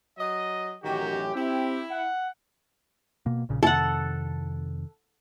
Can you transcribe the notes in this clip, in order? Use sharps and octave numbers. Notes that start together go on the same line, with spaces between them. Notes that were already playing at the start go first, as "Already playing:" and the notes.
F#3 D#5
A1 F#2 D#3 F#4 G4
C4 E4 G4
F#5
B2 A#3
A#1 A#2 C#3
F2 C3 D#3 A4 F#5